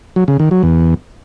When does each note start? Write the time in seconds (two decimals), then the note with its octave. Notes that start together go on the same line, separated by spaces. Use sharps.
0.16 F#3
0.28 C#3
0.40 D#3
0.51 F#3
0.63 E2